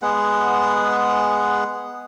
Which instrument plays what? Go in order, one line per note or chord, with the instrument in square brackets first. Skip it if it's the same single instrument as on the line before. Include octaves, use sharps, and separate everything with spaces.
[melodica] G#3 B3 G#4 F#5